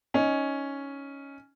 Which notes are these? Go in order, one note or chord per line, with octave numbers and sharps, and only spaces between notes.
C#4 D#4